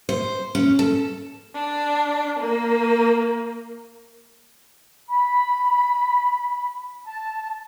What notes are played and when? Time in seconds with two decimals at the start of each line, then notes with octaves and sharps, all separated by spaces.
0.09 C5
0.55 C#4
0.79 A4
1.55 D4
2.40 A#3
5.08 B5
7.03 A5